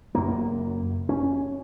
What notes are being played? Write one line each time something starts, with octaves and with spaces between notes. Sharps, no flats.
F#2 C#3 A#3
C#4